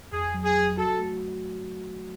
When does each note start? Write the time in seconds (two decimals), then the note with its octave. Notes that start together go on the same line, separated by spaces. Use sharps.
0.12 F2 G#4
0.34 F#3
0.44 G#4
0.56 F#3
0.77 F#4 A4
0.99 A3